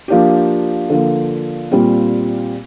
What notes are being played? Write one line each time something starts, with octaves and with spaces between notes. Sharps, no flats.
F3 A#3 D4 G4
D3 F3 A#3
A#2 G3 C4 F4